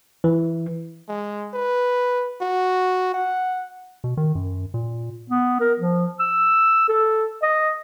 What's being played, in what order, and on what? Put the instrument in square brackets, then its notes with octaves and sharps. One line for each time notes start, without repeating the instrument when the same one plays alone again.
[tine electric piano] E3
[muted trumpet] G#3
B4
F#4
F#5
[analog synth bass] B2
D#3
F#2
A#2
[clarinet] B3
A#4
F3
E6
A4
D#5